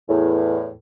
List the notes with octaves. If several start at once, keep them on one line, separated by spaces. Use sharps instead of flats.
E2 A2